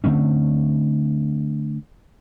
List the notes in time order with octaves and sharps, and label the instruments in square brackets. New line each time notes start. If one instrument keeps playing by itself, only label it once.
[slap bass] D3 A3 C4 C#4